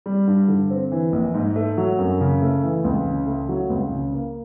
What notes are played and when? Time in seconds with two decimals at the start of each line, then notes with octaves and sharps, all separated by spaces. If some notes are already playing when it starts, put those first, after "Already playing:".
0.06 G3
0.27 G2
0.48 D3
0.70 C4
0.92 E3
1.13 A#1
1.34 G#2
1.56 A3
1.77 F#3
1.99 F#2
2.21 C#3
2.42 A3
2.63 E3
2.84 C#2
3.06 C#3
3.27 A3
3.49 F#3
3.70 C#2
3.91 C#3
4.13 A#3